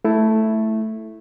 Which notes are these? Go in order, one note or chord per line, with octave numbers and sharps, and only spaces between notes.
A3 E4